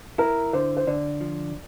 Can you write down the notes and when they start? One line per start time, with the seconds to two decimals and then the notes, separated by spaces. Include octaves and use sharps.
0.18 E4 A#4
0.53 D3 C5
0.77 C5
0.87 D3 D5
1.21 F3